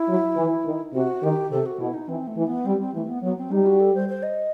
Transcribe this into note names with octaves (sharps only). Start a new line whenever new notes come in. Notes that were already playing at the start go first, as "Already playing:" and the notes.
Already playing: E4
F#3
E3
D#3
C3 F#4
D#3 G4
C3 A4
F#4
B2 E4
D#4
E3 C4
A3
E3
B3
G3 C4
C4
E3 A3
B3
F#3 B3
C4
G3 D#4
F#4
A4
C5
C5
D#5